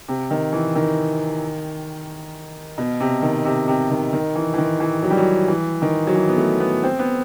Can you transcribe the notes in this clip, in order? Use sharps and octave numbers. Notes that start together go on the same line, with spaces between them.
C3
D#3
E3
D#3
B2
C3
D#3
C3
C3
D#3
D#3
E3
E3
D#3
E3
F#3
G3
F#3
E3
D#3
F#3
E3
B3
A3
B3
C4
B3